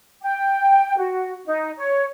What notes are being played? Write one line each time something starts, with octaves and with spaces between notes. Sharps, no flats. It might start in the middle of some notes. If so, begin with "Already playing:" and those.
G5
F#4
D#4
C#5